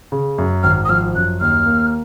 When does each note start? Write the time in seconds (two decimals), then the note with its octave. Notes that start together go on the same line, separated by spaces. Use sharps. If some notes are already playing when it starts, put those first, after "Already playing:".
0.12 C#3
0.38 F#2
0.63 G#1 F6
0.85 D#6
0.89 F3 F6
1.15 F#2 F#6
1.41 D#2 F6
1.66 A#3